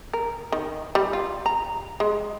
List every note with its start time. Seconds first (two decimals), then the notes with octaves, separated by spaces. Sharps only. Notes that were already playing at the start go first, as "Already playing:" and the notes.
0.13 A#4
0.52 D#3
0.95 G3
1.13 F4
1.46 A#5
2.00 G#3